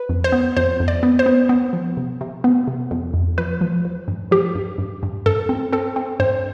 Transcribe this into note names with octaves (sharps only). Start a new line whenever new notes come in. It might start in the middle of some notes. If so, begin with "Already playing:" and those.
Already playing: B4
F2
C5
B3
F2 C5
F2
D5
B3
C5
B3
B3
F3
C3
C3
B3
C3
F2
F2
F3 B4
F3
F3
G2
F3 G4
G2
G2
G2
G2 A4
C4
C4 A4
C4
G2 C5